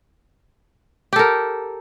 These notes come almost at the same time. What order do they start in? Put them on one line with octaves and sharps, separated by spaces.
G4 A4 A#4